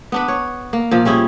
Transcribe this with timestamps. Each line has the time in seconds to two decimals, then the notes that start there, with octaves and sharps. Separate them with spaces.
0.12 B3 D4 B4
0.28 C#5
0.73 A#3
0.91 A#2 F3
1.05 G3 C#4 E4 G#4